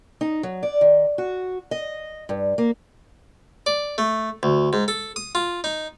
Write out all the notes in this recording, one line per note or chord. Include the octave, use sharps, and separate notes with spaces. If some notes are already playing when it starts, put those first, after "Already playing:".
D#4
F#3
D5
D#3
F#4
D#5
G2
A#3
D5
A3
D2
G#2
A4
D#6
F4
D#4